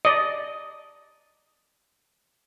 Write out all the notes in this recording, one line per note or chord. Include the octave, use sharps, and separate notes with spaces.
D5 D#5